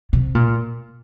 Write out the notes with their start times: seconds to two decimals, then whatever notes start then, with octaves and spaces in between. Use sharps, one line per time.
0.13 C3
0.35 A#2